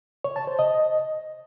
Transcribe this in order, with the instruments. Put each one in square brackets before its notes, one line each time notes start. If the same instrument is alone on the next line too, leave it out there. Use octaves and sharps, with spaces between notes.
[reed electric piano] C#5
A5
C5
D#5